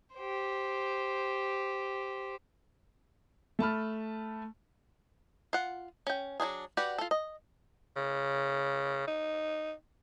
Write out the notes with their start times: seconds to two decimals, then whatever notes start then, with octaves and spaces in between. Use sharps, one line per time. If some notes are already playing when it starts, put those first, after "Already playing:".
0.16 G4 C5
3.59 A3 A5 B5 F6
5.53 F4 F#5
6.07 C#4 G5
6.40 F#3 G#3 D4 G#4
6.77 F#4 G4 B4 D5 F#5
6.98 F4 A4
7.11 D#5
7.97 C#3
9.08 D#4